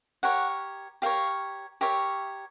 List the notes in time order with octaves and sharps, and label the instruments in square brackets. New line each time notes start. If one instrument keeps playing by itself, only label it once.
[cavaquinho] G4 A#4 C#5 F#5
G4 A#4 C#5 F5
G4 A#4 C#5 E5